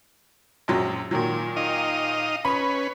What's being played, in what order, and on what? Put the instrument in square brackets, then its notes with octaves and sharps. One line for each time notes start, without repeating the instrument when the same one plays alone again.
[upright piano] A#1 F#2 F#3
A#2 D#3 F#3
[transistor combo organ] D#4 D#5 F5
[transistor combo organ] C#4 B4 [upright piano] B5